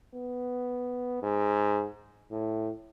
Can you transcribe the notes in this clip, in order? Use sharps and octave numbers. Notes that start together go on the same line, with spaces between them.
B3
G#2
A2